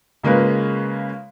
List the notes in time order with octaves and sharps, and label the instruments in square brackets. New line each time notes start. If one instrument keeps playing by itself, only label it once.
[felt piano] C#3 G#3 A#3 F4 B4